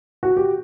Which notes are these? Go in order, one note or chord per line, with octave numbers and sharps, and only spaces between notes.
F#4
G4